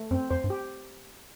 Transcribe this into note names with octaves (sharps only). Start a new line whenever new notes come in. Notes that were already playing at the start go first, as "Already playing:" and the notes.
Already playing: A3
F#2 C4
F2 C5
G2
G4